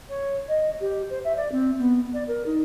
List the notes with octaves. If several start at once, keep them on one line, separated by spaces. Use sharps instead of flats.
C#5
D#5
G4
C5
E5
D5
C4
B3
D5
A#4
D#4